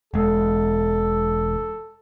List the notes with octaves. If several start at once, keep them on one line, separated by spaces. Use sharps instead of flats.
E1 G#3 A4